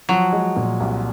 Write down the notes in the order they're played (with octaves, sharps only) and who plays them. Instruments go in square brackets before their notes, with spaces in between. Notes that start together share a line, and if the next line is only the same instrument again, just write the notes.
[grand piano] F3 [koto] F#3
[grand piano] G#3
A#2
C2